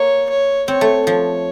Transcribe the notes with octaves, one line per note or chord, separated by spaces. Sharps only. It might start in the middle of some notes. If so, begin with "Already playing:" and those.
Already playing: A#3 C#5
C#5
C4 C#5
A3
F3 C#5